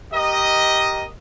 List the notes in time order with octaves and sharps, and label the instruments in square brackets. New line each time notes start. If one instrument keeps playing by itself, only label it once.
[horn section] G4 A#4 D#5